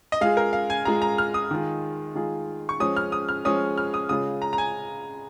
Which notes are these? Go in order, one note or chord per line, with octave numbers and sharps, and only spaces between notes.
D#5
G#3 F4 G#4 F5
A#4
F5
G#5
G#3 F4 G#4 A#5
A#5
F6
D#6
D#3 G#3 F4 G#4
D#3 G#3 F4 G#4
C#6
F3 G#3 C#4 D#6
F6
D#6
F6
F3 G#3 C#4 D#6
F6
D#6
C#3 G#3 F4 G#4 D#6
A#5
A#5
G#5